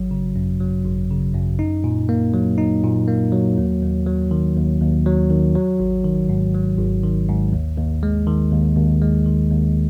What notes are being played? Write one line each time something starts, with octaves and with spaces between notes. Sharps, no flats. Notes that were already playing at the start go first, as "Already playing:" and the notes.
Already playing: G#1 F#3
C#3
F#2
F#3
G#1
C#3
F#2
D#4
A#2
A#3
F#3
D#4
A#2
A#3
F#3
D#2
D#2
F#3
D#3
D#2
D#2
F#3
D#3
F#3
G#1
D#3
G#2
F#3
G#1
D#3
G#2
D#2
D#2
G#3
D#3
D#2
D#2
G#3
D#3
D#2